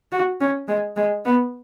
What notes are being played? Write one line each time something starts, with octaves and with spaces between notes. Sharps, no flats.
F#4
C#4
G#3
G#3
B3